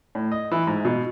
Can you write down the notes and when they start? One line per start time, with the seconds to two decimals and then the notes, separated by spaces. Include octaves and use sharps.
0.15 A2
0.32 D#5
0.51 E3
0.67 G#2
0.85 B2